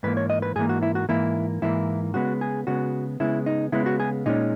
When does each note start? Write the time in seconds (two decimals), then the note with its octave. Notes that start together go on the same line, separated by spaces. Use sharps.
0.03 G#2 E3 A#3 B4
0.17 C#5
0.30 D#5
0.42 B4
0.56 G#2 E3 A#3 G#4
0.69 F#4
0.83 E4
0.95 F#4
1.09 G#2 E3 A#3 E4
1.62 G#2 E3 A#3 E4
2.14 C#3 G#3 B3 F#4
2.41 G#4
2.67 C#3 G#3 B3 F#4
3.20 C#3 G#3 B3 E4
3.46 D#4
3.72 C#3 G#3 B3 E4
3.86 F#4
4.00 G#4
4.26 A#2 G#3 C#4 D#4